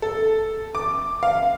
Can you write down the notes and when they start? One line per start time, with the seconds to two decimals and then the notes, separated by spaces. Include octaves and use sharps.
0.02 A4
0.75 D6
1.23 F5